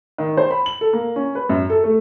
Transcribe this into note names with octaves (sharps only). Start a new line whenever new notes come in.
D#3
C5
B5
F#7
A4
A#3
C#4
B4
F#2
A4
A3